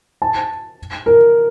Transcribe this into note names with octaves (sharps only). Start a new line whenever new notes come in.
A5
A#4